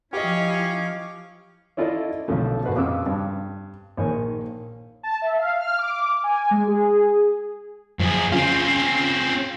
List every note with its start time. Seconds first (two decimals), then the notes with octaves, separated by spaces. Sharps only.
0.13 F3 C#4 E4 G4 D#5 F5 C#6 D6
1.77 C#4 E4 F4 A4 D5 D#5
2.28 B1 D3 F3 A3
2.64 A#1 F#4 B4 C5 D#5
2.76 F2 C#3 F3 D6 E6
3.06 G2
3.97 A#1 D#3 C#5 G#5
5.03 A5
5.22 E5
5.38 F5
5.60 F6
5.79 D6
6.24 G#5
6.51 G#3
6.68 G#4
7.99 F#2 F3 G#4
8.32 C#3 C4 C#4 F4